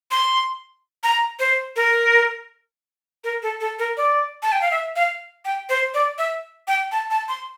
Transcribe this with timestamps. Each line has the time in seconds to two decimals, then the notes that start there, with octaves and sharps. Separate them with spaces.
0.11 C6
1.03 A#5
1.39 C5
1.76 A#4
3.24 A#4
3.43 A4
3.60 A4
3.79 A#4
3.97 D5
4.43 A5
4.52 G5
4.61 F5
4.71 E5
4.96 F5
5.45 G5
5.69 C5
5.94 D5
6.18 E5
6.68 G5
6.92 A5
7.11 A5
7.29 C6